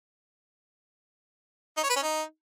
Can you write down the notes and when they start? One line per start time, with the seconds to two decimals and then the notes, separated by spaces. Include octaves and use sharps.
1.77 D#4
1.84 C#5
1.90 B4
1.96 C#4
2.03 D#4